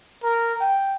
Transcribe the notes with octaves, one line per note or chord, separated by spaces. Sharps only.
A#4
G5